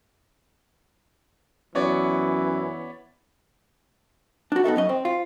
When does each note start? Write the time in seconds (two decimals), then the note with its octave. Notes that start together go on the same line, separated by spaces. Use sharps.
1.75 F#2 E3 B3 C#5 D5
4.52 D4 F#4
4.64 B3 D#4 A4 E5
4.76 F#2 C#4 D#5
4.89 C4
5.05 F4